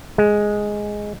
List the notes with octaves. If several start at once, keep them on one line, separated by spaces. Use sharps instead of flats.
G#3